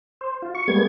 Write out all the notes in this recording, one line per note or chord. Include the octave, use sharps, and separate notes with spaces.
C5
F4
C#6
G3 G#3 A#3 B3 G#6